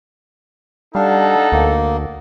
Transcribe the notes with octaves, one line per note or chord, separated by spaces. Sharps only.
G3 D4 D#4 A4 F5 F#5
D2 A#3